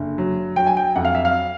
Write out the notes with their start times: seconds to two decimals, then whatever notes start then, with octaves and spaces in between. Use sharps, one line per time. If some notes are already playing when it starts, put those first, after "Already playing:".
Already playing: F#1 D3
0.18 F#3
0.56 F#3 G5
0.66 G#5
0.77 G5
0.96 F2 F#5
1.05 F5
1.15 E5
1.25 F5